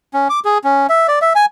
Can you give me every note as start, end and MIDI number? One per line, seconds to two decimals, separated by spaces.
0.14 0.28 61
0.30 0.40 86
0.45 0.58 68
0.64 0.87 61
0.89 1.07 76
1.08 1.19 74
1.22 1.33 76
1.35 1.45 80